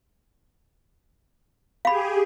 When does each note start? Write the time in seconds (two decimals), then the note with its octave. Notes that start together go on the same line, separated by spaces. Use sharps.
1.85 G4 G#4 F5 B5